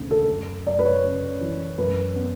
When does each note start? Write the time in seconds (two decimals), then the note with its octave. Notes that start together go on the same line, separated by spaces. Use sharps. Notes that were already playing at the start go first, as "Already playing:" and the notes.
Already playing: E1 D2 C#3
0.11 A4
0.28 F#2
0.67 F#2 D5
0.79 B4
0.85 C#5
1.03 C#3
1.41 E3
1.78 F#2 B4
2.15 B3